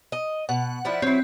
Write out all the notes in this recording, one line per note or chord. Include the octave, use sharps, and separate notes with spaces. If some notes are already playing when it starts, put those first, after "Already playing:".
D#5
B2 F#5
F3 D4 E4
F#3 C4 E4